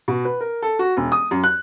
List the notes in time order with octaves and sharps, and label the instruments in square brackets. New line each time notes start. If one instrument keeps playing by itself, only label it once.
[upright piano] B2
B4
A#4
A4
F#4
E1
D#6
F#2
F#6